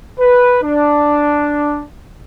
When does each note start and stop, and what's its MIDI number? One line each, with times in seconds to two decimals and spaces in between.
0.19 0.60 71
0.62 1.82 62